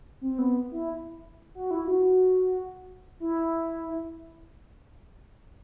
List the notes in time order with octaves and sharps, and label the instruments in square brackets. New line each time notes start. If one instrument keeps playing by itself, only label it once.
[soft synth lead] C4
B3
E4
F#4
E4
F#4
E4